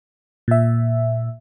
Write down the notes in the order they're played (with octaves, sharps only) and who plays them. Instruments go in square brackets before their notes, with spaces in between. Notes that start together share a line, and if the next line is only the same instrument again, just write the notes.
[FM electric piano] A#2 E5